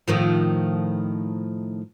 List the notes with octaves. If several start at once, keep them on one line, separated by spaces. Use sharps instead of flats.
A2 D#3 F3